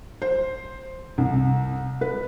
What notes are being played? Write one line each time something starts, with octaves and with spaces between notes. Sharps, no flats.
C5
C2
B4